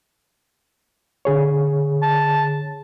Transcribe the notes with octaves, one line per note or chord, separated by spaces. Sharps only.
D3 G#4 C#5
A5